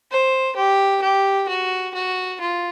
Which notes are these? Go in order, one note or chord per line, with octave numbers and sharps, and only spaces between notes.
C5
G4
G4
F#4
F#4
F4